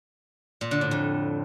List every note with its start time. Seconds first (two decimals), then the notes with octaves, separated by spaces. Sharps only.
0.61 A#2
0.71 D3
0.81 A2
0.91 F2